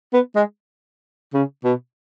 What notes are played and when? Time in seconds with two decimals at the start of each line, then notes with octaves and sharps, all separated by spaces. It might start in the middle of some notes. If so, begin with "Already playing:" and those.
0.13 B3
0.36 G#3
1.34 C#3
1.64 B2